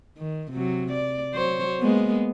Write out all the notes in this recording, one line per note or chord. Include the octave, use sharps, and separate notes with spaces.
D#3
C3 F#3
D5
F#3 C5 C#5
G#3 A#3 B3